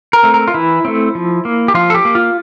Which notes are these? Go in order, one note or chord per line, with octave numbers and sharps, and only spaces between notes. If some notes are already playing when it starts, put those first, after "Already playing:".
A#4
A3 C4
A#4
F4
E3 E4
A3 C4
F3
A#3
G4
F3 F4
A4
G4
A#3
F4